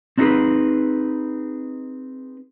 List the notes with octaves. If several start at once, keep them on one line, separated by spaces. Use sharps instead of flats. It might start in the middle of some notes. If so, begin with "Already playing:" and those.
C4 D4 D#4 F4 G#4 B4